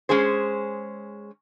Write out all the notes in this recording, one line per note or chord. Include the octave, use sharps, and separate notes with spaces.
G#3 C#4 G#4 C5